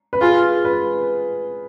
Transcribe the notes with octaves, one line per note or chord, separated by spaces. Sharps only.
B4
F4 G#4
B4